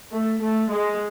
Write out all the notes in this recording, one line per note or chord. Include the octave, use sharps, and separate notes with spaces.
A3
A3
G#3